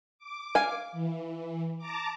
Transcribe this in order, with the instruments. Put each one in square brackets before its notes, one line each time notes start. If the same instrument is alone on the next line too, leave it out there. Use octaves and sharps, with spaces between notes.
[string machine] D6
[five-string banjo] F5 G#5
[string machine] E3
A5 A#5 D6